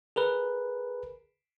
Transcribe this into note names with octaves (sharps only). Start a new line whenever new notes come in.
G#4 A#4 B4